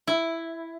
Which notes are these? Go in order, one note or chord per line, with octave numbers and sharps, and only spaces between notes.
E4